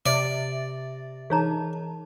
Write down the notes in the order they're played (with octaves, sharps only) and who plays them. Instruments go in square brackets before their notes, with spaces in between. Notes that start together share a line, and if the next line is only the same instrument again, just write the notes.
[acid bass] C3 [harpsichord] D5 [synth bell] E5 A6
[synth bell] E3 D#4 A5 [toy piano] G#4 C#5 A#5